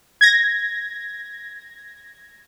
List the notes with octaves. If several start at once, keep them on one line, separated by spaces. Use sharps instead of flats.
G#6 A#6